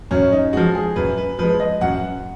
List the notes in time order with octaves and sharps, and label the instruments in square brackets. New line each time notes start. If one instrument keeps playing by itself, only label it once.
[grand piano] F#2 C#4
D#4
F3 G#3 F#4
G#4
F#2 B4
B4
F3 G#3 B4
D#5
F#2 F#5